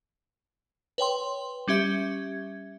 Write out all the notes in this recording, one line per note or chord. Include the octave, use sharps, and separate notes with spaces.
B4 C#5 G5 C6
G3 C#4 G4 E5 G#6